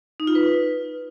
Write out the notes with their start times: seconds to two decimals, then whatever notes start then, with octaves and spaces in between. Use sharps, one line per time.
0.20 D#4
0.27 F4
0.35 B4